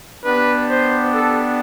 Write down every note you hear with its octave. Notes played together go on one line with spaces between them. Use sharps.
B3 D4 G4 B4
C5
A4